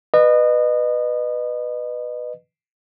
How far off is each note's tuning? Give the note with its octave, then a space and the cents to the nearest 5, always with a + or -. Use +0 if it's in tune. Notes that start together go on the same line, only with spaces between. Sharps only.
B4 +0 D#5 -30